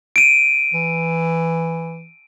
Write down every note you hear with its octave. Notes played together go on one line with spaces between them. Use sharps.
D7 D#7
E3